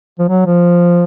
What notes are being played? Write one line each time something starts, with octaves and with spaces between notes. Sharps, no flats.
F3
F#3
F3